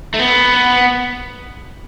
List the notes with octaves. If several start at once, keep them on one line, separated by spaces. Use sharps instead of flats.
A3
B3